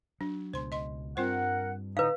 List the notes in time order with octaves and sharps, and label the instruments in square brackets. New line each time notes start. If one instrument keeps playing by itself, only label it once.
[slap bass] F#3 [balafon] D4
[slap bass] C#2 B2 [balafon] C5 C6
[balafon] D#5 C6
[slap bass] G2 G3 [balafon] C4 F4 C5 [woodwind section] A#4 F#5
[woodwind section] A2 D3 D#4 [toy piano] B4 F5